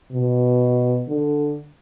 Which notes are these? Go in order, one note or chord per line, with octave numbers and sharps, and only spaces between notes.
B2
D3